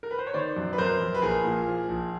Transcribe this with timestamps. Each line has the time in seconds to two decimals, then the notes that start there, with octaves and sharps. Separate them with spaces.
0.03 A#4
0.11 B4
0.18 C5
0.27 C#5
0.33 D#3 C5 D5
0.56 F#2
0.73 B4
0.78 F#2 A#4 C5
1.00 F#2
1.14 B4
1.22 A#1 G#4 A#4
1.44 A#2
1.67 F3
1.89 A#1